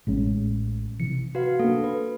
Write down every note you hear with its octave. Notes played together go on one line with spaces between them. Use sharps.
A1 G#3 C#4
C3 E3 C#7
F#4 B4 F5
A#3 D4 A4
B4